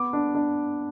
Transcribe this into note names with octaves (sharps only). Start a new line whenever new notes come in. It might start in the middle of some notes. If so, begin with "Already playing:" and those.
Already playing: B3 D6
D4
D4